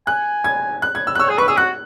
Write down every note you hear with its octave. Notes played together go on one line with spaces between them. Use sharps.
G#5 F#6
G#6
F#6
G#6
E6
F#6
C#5 E6
G#4
B4 C#6
G#4 E6
F#4 F#6